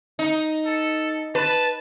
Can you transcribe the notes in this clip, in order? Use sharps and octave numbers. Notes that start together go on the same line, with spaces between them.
D#4
A4
B4 A5